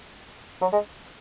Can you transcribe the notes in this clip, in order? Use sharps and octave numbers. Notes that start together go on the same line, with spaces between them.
F#3
G#3